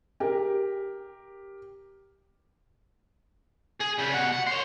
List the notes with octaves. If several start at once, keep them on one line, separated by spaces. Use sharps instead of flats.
G4 A#4
G#4
C#2 G3
B2 F#5
F#5
C5 C#5